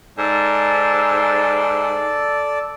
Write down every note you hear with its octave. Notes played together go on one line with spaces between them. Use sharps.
G#2 A4 D5